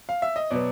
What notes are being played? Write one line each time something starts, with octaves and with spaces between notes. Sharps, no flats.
F5
E5
D#5
B2 F#3 B3 D5